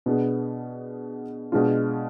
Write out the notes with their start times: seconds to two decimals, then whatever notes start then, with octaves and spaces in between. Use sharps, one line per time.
0.06 B2 B3 D4 G#4
1.52 B2 G#3 D4 F4